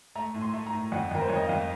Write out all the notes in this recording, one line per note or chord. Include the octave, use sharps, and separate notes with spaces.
A3 A#5
A2
C6
A3
A#5
A2
F2 F#5
F2 A#4
C5
F2 C#5
D#5
F5
F2